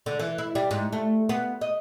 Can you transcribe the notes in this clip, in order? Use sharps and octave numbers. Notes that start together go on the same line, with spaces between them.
D3
E3
E4
G3
G#2
A3
B3
D#5